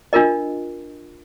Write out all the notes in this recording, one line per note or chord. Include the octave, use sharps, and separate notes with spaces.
D4 F4 A#4 D#5